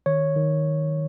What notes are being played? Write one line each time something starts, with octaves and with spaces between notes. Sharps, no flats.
D#3 C#5
D#3